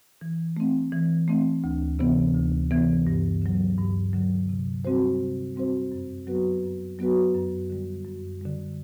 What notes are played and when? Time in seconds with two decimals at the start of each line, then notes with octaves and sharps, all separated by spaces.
0.21 E3
0.57 A3 C4
0.93 E3
1.28 A3 C4
1.64 D2
1.99 C3 E3 B3
2.35 D2
2.71 C3 E3 B3
3.07 G2
3.42 D3 F#3
3.78 G2
4.13 D3 F#3
4.49 C3
4.85 G3 C4 F#4 C5
5.20 C3
5.56 G3 C4 F#4 C5
5.92 F#2
6.27 F#3 B3 F#4 B4
6.63 F#2
6.99 F#3 B3 F#4 B4
7.34 F#2
7.70 D3 G3
8.05 F#2
8.41 D3 G3